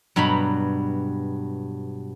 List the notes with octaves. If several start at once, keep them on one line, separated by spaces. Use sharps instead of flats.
G2 B2 F#3 A#5 B5